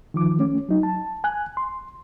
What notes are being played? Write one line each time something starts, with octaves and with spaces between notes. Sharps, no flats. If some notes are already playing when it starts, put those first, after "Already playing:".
D#3 F3 D6
A3 C#4
F#3 D#4
A5
G#5 F#6
C6